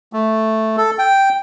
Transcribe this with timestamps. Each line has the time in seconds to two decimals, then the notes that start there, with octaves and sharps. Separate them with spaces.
0.13 A3
0.77 A4
0.99 G5